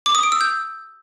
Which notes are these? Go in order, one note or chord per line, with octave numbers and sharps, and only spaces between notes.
D6
D#6
D7
E6
G6